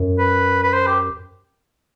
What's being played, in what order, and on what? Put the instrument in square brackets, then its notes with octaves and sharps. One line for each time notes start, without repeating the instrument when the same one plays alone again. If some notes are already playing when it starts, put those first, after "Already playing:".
Already playing: [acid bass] F#2
[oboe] B4
B4
C5
G4